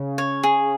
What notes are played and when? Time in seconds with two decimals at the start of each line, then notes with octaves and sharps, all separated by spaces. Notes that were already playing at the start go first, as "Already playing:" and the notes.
Already playing: C#3
0.18 C#5
0.44 G#4